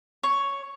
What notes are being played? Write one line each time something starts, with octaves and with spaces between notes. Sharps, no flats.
C#5